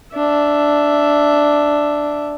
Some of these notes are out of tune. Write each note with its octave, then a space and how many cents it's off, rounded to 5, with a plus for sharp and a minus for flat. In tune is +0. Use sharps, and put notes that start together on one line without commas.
D4 +0 E5 +5